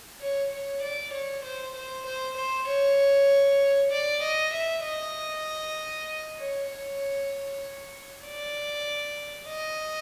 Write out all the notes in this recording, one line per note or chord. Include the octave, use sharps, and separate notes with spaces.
C#5
C#5
D5
C#5
C5
C5
C5
C5
C#5
D5
D#5
E5
D#5
C#5
C#5
D5
D#5